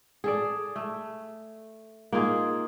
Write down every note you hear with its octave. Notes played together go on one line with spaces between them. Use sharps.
G#4 A4 D5
A3
A#3 D#4 F4 G#4